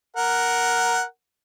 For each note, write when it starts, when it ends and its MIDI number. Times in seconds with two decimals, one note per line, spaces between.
0.17 1.03 70
0.17 1.03 78